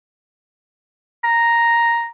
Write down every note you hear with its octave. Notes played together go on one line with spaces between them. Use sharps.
A#5